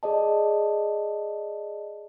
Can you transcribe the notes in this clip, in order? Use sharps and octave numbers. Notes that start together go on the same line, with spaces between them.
G#4 D5 D#5 A5